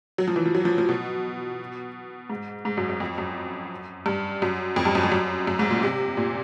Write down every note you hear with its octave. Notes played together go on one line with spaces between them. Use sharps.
F#3
F3
E3
F3
F#3
F3
F3
B2
G#2
G#2
F#2
F#2
F2
F#2
G2
F#2
F2
G2
F#2
F2
F#2
F#2
G#2
A#2
C3
A#2